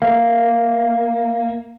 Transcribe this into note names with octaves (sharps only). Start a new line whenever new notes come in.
A#3 A#4 E5 F5